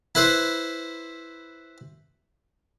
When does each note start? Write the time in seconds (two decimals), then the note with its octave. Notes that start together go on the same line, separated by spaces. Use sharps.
0.15 E4 B4 C5